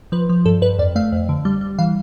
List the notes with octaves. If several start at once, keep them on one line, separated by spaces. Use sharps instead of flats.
F3 B4
F3
G2 A4
G2 B4
F2 D5
A3 F5
F2
D3
G3
G3
E3 F5